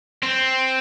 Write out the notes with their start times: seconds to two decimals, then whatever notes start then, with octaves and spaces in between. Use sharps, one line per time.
0.23 C4